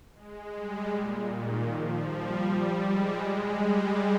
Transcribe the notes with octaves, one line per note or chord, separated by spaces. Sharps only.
G#3
G3
A#2
D#3
F3
G3
G#3
G3